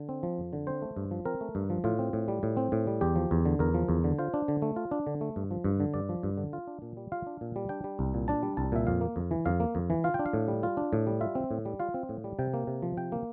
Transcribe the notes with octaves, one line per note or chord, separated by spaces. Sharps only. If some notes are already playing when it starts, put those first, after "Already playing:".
Already playing: D3
C4
F3
F2
D3
C4 C5
A3
G2
F3
C4 A#4
A3
G2
F3
A2 F4
C4
A2
G3
A2
C4
A2
G3
E2 G4
F3
E2
D3
E2 A#4
F3
E2
D3
F4 C5
D4
D3
A3
F4
D4
D3
A3
G2
F3
G2
D3
G2 D5
F3
G2
D3
F4
D4
A#2
G3
F4 F5
D4
A#2
G3
D4 G5
G3
C2
A#2
D4 A5
G3
C2 A5
A#2 E5
F2 F5
A#3
F2
E3
F2 F5
A#3
F2
E3
F4 F5
G5
D4
F5
A2
G3
F4
D4
A2
G3
F4 E5
C4
A2
G3
F4 F5
C4
A2
G3
C3 G5
A#3
C3
F3
C3 G5
A#3